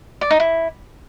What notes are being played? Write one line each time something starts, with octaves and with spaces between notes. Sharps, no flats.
D5
D#4
E4